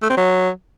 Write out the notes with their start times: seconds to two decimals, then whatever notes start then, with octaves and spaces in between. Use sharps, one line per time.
0.03 A3
0.10 C4
0.17 F#3